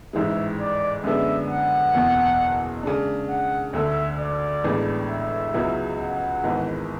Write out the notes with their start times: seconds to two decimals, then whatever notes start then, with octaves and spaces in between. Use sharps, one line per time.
0.13 A1 G#2 E3 G#3 E5
0.59 D5
1.04 F#2 D3 G#3 B3 D4 E5
1.49 F#5
1.94 F#1 E2 B2
2.83 C#3 G#3 D4
3.29 F#5
3.73 D2 D3 A3 E5
4.19 D5
4.64 A1 A2 G#3 B3 D4
5.09 E5
5.54 C#2 C#3 F#3 B3 E4
5.99 F#5
6.44 G#1 G#2 E3 B3